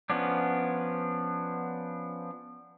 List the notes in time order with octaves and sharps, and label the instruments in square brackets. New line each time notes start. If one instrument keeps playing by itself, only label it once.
[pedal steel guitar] F3 B3 C#4 D4